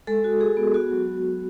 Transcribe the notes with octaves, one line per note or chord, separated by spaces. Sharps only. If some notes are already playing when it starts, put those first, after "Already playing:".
G#3 A4
F#4
F#4 G#4
B3
B3 F#4
F#3